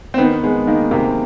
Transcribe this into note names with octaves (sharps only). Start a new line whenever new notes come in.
C4
D#3 B3
G#3 B3
D#3 A#3
C3 A#3